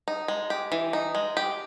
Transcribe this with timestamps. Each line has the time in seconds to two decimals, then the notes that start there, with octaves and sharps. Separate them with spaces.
0.08 D#4
0.28 G#3
0.50 G4
0.72 E3
0.93 D#4
1.15 G#3
1.37 G4